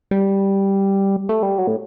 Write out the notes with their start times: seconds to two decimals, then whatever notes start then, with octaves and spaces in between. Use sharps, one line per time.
0.11 G3
1.29 A3
1.43 G3
1.58 F#3
1.67 A2